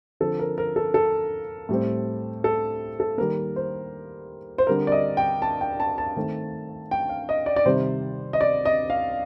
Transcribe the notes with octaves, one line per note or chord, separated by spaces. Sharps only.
D3 F3 C4 A4
A#4
A#4
A4
A4
A2 G3 C4
A4
A4
D#3 G3 A#3 A#4
C5
C5
D3 G3 C4 A#4
D5
D#5
G5
A5
G5
A5
A5
D#3 A3 C4
G5
F5
D#5
D5
D5
C3 D#3 G3 C4 C5
D#5
D5
D#5
F5